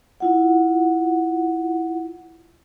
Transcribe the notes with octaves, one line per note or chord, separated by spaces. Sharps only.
E4 F4 F#5